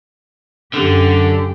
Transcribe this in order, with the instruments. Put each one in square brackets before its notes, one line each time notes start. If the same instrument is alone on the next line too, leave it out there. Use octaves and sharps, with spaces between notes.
[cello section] F#2 G4 [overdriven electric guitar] D3